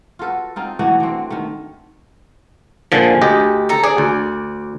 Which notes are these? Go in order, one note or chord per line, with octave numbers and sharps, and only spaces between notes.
F4 F#4 A4 B4
C4 D#4 F4
E3 A3 D4 F#4
D3 C4
D#3 A3
A#2 D3 F3 G#4
D2 G4 D#5
A4 A#5
G#4 D5
D2